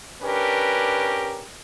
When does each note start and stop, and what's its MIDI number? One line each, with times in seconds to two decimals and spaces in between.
0.22 1.46 61
0.22 1.46 62
0.22 1.46 67
0.22 1.46 70
0.22 1.46 71